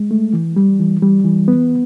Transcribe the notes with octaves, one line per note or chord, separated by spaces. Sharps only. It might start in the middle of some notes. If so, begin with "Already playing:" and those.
Already playing: G#3
A3
E3
G3
E3
G3
E3
B3